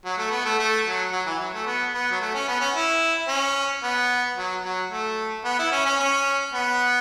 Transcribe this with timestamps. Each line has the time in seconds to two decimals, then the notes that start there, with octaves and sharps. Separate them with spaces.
0.05 F#3
0.18 A3
0.31 B3
0.45 A3
0.59 A3
0.86 F#3
1.12 F#3
1.26 E3
1.39 F#3
1.54 A3
1.66 B3
1.94 B3
2.11 F#3
2.21 A3
2.34 C#4
2.48 B3
2.61 C#4
2.75 E4
3.28 C#4
3.83 B3
4.37 F#3
4.64 F#3
4.90 A3
5.45 B3
5.59 E4
5.72 C#4
5.85 C#4
5.99 C#4
6.54 B3